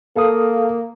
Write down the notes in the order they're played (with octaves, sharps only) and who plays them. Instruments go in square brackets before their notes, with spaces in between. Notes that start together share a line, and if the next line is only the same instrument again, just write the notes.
[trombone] A#3 [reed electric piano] A4 F5 D#6